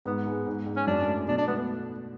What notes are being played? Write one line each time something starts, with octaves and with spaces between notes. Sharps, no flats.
G#2 B3
G#3
G#2
G#2
C#4
F#2 D4
A3
B2 D4
D4
A3 B3